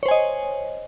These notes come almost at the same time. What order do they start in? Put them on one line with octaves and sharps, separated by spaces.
C#5 C5 G#5 D#5